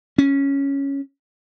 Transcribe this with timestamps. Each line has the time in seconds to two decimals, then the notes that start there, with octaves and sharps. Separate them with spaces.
0.18 C#4